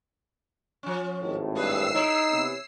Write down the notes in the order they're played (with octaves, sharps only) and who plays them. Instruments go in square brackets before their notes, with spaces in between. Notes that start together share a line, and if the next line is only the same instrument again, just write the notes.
[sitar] F3 C#4
[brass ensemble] G#1 D#2 A2
[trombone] G2 [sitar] C#4 G#4 B4 [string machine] E6 C7
[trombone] D#4 [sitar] E4 C#5
[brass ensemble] C3 E3 B3